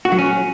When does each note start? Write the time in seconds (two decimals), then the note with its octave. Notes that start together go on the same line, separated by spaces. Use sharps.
0.05 F#4
0.12 F#3
0.18 C#4